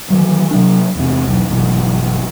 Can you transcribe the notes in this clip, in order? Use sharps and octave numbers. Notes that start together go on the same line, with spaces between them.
D#3 E3 F#3
C3 F#3 D4
E2 C3
B1 E2 B2
G1 F#2 B2 E3